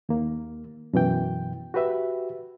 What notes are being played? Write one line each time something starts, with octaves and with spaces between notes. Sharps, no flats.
D#2 A#3
F#2 B2 E3 G5
F#4 G4 B4 E5